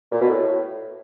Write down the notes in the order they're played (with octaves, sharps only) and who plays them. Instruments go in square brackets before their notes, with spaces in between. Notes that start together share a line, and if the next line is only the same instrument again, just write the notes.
[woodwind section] A#2
B2
A2